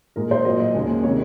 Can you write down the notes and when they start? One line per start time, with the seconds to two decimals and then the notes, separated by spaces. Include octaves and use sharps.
0.16 A#2 G#3 A#4
0.31 C5
0.45 A#2 F#3 A#3 D#5
0.60 D#5
0.74 D#2 C#3 G#3
1.04 C3 D#3 G#3 C#5